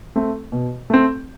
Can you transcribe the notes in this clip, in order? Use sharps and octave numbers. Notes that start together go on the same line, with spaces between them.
A3 C4
B2
A3 C4